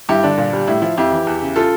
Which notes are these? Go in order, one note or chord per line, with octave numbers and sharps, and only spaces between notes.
G2 E4 G4
D3 D4
A#2
G3
A2 E4
F3 E4
F2 E4 G4
E3
E2
C#3
F4 A4